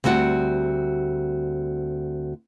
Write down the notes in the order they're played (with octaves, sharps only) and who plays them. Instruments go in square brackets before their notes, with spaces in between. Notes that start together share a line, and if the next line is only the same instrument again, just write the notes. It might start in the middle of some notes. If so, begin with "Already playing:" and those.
[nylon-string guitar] D2 G3 C4 F#4 F#5